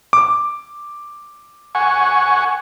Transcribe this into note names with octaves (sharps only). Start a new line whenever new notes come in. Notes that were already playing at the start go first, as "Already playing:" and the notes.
D6
F#5 G#5 C#6